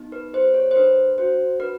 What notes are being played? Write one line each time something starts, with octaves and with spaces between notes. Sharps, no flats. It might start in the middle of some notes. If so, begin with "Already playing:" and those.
Already playing: B3 D#4
B4
G4 C5
C#5
C5
D4 B4
F#4 C5
D4 B4